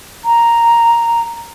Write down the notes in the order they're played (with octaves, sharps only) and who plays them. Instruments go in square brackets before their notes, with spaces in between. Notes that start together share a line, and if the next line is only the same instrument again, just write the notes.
[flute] A#5